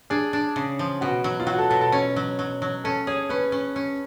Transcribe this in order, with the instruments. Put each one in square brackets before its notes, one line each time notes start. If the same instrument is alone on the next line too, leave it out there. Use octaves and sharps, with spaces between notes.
[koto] D4 [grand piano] G#4
[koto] D4
C#3
F3
[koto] B2 [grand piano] F#4
[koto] F#3
[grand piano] F4
[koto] F#3 [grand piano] F#4
[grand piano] A4
[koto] B2 [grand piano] A4
[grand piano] A4
[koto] C#4 [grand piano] C#5
[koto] F#3
F#3
F#3
[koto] C#4 [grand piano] A4
[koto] G#4 [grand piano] C#5
[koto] C#4 [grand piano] B4
[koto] C#4
C#4